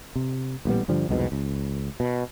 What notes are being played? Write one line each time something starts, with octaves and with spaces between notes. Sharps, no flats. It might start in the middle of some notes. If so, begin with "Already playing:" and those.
C3
A1 A#2 G3 B3
G2 D3 F3 G3
C2 F2 G#2 B2
C#2
B2